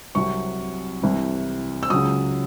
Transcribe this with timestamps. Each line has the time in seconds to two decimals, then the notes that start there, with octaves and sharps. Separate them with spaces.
0.15 C2 C3 F#3 C#6
1.02 C2 C3 E3
1.83 E6
1.90 C#2 C#3 F#3 D#6